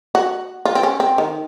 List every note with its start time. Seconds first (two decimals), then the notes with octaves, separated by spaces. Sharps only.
0.15 F#4
0.65 F4
0.75 C4
0.83 C#4
1.00 C4
1.18 D#3